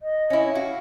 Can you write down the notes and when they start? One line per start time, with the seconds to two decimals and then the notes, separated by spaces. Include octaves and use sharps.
0.01 D#5
0.30 C#4 E4
0.55 F#4 F5